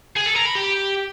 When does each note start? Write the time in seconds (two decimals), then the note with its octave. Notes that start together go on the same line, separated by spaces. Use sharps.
0.17 G#4
0.26 A4
0.36 A#4
0.46 B5
0.55 G4